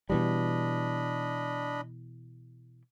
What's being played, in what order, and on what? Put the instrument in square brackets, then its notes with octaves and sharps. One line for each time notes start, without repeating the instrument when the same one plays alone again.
[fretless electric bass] B2 E3 G3 [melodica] D4 D#5 B5